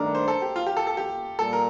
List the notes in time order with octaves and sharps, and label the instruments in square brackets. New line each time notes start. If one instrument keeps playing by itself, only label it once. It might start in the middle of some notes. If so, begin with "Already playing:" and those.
Already playing: [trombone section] G2 D#3 A3 D4 [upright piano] A4 A#4
[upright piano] C5
A4
G4
F4
G4
A4
A4
G4
[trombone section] A#2 G3 [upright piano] A4
[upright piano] A#4